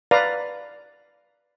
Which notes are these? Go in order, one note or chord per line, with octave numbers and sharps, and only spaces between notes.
B4 D5 F5 A#5